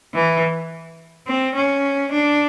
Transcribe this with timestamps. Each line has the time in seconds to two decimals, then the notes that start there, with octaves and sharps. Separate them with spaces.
0.14 E3
1.27 C4
1.55 C#4
2.12 D4